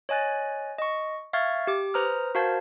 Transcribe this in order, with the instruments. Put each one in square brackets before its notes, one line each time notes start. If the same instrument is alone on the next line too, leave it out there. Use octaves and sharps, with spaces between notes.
[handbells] C#5 D#5 G#5 F#6 A6
D#5 C#6
E5 F5 C#6 F6 G#6 A6
G4 D6
B4 C5 A#5 D#6 F6
F#4 A#4 C5 F5 A5 G#6